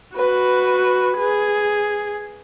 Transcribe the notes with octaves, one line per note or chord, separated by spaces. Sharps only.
F#4 B4
G#4